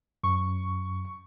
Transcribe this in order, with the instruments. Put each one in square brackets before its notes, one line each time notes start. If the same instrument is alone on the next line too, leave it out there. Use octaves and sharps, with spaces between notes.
[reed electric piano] F#2 [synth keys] C#6